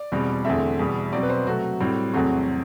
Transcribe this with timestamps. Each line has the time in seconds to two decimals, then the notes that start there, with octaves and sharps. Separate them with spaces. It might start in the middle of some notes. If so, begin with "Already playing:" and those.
Already playing: D5
0.12 E2 B2 G3 C4
0.45 E2 D3 A3 C4 E5
0.79 E2 B2 G3
1.12 B2 F#3 C4 D5
1.23 B4
1.30 C5
1.46 C3 F#3 A3 F#4
1.80 A2 G3 C4
2.14 E2 C3 F#3 A3 C4 F#4